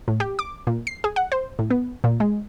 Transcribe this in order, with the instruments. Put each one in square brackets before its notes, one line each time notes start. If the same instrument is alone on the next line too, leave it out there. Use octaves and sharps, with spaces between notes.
[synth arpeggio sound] A2
G4
D6
A#2
C7
G#4
F#5
C5
A2
B3
A#2
G#3